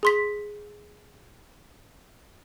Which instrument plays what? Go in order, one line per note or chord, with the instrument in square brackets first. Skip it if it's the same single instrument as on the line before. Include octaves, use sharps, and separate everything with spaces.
[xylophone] G#4 C6 B6